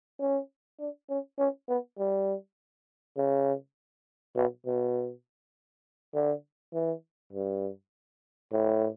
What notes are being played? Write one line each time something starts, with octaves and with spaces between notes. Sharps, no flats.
C#4
D4
C#4
C#4
B3
G3
C#3
B2
B2
D3
E3
G2
A2